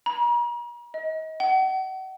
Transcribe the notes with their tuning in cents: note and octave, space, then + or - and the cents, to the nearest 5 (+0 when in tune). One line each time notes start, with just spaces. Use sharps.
A#5 +40
D#5 +30
F#5 +40